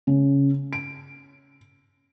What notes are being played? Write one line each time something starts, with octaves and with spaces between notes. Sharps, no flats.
C#3
D7